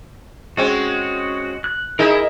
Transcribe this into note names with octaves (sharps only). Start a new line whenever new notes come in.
G#3 C4 C#4 F#4
F#6
D#4 E4 G#4 A#4 D#5 E5